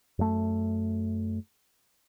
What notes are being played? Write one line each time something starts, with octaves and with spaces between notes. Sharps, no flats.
F#2 A3